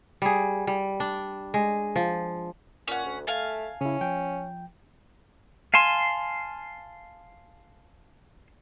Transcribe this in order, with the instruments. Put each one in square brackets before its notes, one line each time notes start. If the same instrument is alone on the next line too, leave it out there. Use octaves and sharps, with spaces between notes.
[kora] G3 G#4
G3
D4
G#3
F3
[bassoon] A#2 [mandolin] C#4 F#5
[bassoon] D2
[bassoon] A3 [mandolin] F5 G#5 A5
[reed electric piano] C#3 E4 [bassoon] C#4
[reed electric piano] F3 G5
[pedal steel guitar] F5 G#5 A5 C6